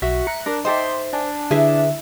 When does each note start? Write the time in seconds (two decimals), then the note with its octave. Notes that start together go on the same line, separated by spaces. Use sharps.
0.02 B1 F#4 E5
0.27 A#5 F#6 C#7
0.46 D4 A#4
0.65 D#4 A4 C5 D#5 E5 G5 C6 D6
1.13 D4 G#5
1.51 D3 E4 G#4 B4 E5